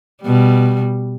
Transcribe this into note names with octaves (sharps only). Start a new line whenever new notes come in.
B2 G3